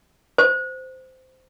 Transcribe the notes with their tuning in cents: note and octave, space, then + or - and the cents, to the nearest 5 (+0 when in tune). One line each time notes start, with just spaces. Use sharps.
C5 -15